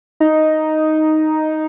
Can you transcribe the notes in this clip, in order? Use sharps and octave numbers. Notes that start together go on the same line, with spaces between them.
D#4